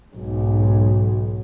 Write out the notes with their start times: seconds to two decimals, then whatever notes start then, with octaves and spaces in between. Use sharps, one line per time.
0.15 B1 G#2